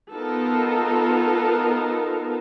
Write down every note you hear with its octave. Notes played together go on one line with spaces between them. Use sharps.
B3 D#4 F4 A4 A#4